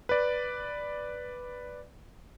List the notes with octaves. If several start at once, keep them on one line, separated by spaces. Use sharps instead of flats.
B4 D5